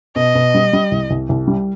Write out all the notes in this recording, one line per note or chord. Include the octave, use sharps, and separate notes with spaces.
B2 D#5
B2
G3
G3
C2
C2
C2
G3